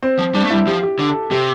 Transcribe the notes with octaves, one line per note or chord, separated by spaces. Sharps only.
C4
F3
G3 D4
A3
G3 E4
F3 G4
G4
D3
A4
C3 G4